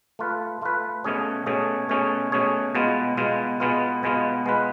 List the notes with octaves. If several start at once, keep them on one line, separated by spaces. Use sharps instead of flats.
A3 F4 B4
A3 F4 B4
B2 A3 C#4 G#4 C#5
B2 A3 C#4 G#4 C#5
B2 A3 C#4 G#4 C#5
B2 A3 C#4 G#4 C#5
B2 G#3 B3 F4
B2 G#3 B3 F4
B2 G#3 B3 F4
B2 G#3 B3 F4
G#3 B3 F4 B4